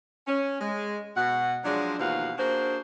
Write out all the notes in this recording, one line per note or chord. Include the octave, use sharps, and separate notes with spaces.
C#4
G#3
B2 F#5
F3 F#3 G#3 D4
D#2 B2 E3 F3 F#4 F5
A#3 D4 F#4 G#4 C5